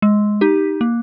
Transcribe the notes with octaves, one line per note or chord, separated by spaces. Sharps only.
G#3
D#4 G4
A#3